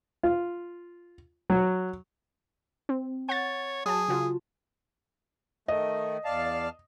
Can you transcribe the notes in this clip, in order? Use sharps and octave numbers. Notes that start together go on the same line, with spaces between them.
F4
F#3
C4
C#5 F#5 A6
F#3 G#4 A5
C#3 F4 F#4
D#3 A3 D#5
E2 D5 F5 A5